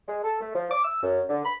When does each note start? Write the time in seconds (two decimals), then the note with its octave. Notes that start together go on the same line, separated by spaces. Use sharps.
0.08 G#3
0.24 A4
0.41 A3
0.55 F3
0.71 D6
0.84 E6
1.03 F#2
1.29 D3
1.45 B5